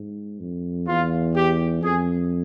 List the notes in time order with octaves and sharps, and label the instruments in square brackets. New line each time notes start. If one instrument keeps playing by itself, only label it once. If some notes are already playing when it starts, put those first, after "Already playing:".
Already playing: [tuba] G#2
F2
[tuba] E2 [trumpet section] F4
[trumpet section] G4
[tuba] F2 [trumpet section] G#4